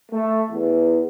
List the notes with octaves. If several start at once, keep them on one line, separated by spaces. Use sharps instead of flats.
A3
E2